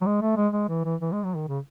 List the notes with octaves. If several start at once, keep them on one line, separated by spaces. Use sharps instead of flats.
F#3
G#3
A3
G#3
G#3
E3
E3
E3
G#3
F#3
D#3
C#3